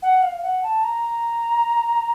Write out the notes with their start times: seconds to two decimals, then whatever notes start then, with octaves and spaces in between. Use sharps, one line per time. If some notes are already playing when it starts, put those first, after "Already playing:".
0.02 F#5
0.23 F5
0.38 F5
0.43 F#5
0.63 A5
0.84 A#5